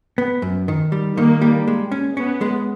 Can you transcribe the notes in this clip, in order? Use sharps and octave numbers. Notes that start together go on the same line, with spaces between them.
B3
F#2
D#3
G3
D#3 A#3
G3
G#3
C#4
B3 C#4
G#3